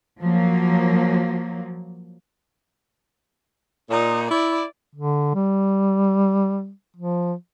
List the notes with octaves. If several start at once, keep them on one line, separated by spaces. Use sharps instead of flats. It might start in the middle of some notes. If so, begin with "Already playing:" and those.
F3 F#3 A#3
A#2 D#4
E4 D5
D3
G3
F3